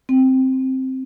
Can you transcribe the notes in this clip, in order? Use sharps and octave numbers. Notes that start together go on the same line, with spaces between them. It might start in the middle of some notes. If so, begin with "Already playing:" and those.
C4